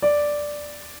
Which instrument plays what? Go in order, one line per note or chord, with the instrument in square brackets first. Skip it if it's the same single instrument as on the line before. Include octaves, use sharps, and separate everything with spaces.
[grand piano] D5